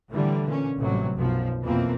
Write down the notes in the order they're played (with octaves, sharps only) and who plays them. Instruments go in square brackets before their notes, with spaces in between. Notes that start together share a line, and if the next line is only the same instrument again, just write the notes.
[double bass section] A2 D3 E3 G3
A#2 C#4
A1 A2 C3 F#3 G3
B1 F#2 F3
F2 B2 E3 F3 A#3 C4